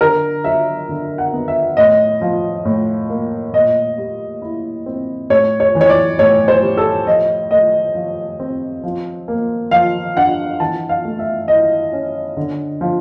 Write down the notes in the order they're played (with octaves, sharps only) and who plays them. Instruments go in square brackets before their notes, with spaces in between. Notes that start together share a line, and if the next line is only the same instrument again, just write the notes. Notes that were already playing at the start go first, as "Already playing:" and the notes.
[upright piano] D3 A#4
F#3 E5
D3
F#5
B3
E5
A2 D#5
F3
A2
A#3
A#2 D#5
G3
E4
C4
A2 C#5
C#5
E3
C#5
D5
A2 C#5
C5
G3
A4
F3 D#5
A3 D#5
F3
C4
F3
A#3
F3 F5
D4 F#5
E3 A5
F5
A3
E5
E4 D#5
C#4
D3
F3